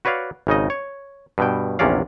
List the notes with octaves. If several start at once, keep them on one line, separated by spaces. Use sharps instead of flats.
F#4 B4 C#5 D5 F5
G#1 C#3 D#4 D#5
C#5
G2 B2 G5
A#1 E2 C3 C#4 D5 F5